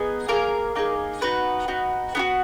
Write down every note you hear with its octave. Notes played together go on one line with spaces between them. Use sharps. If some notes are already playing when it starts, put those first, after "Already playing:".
Already playing: B3 D#4 G#4
A#3 D#4 G#4 A#4
A#3 D#4 G#4
B3 D#4 F#4 B4
B3 D#4 F#4
B3 D#4 F#4